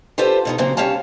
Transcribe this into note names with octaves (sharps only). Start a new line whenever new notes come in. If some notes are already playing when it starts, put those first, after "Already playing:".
F4 G4 A4 B4 C5 D5
B2 B3 D#4
A#2 C#3 F#3 A#3 C4
G3 C#4 C#5 F5 A5